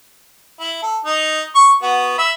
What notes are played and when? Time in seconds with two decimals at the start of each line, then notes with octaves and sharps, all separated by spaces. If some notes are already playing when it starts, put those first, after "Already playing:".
0.60 E4
0.83 A4
1.06 D#4
1.56 C#6
1.83 B3 F#4
2.18 E5 B5